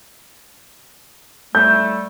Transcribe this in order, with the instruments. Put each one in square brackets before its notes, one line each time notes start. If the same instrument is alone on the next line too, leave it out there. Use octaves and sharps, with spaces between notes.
[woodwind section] A2 G3 A3 [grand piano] G6